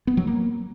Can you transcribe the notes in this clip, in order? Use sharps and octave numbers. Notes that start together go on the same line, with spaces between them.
B3
F#3
A#3